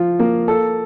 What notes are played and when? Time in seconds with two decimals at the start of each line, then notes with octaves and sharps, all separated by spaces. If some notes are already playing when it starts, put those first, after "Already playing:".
Already playing: F3 F4
0.19 A#3
0.48 A4